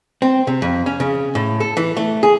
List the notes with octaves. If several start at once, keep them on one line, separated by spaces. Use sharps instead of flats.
C4
C3
F2
C#4
C#3
A2
A4
E3
A3
G#4